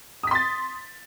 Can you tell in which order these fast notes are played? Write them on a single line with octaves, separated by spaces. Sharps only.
D#6 B6 C6 A6